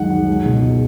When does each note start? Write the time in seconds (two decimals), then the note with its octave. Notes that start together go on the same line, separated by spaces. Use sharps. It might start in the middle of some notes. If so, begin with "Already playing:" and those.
Already playing: C#2 F#2 D#3 F#5
0.10 F#2
0.28 C#2
0.45 B2
0.62 C#2